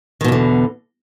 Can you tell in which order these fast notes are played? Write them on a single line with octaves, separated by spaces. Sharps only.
D#3 B2 E2 D3